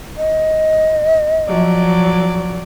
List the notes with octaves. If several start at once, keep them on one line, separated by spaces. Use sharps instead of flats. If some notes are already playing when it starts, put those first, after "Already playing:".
D#5
F3 F#3 D5